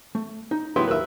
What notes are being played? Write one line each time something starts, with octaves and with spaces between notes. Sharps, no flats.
A3
D#4
A2 F#3 B3 E4 G4 C6
D#2 A#4 B4 E5